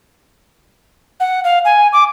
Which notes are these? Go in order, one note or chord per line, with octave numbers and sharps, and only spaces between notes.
F#5
F5
G#5
D6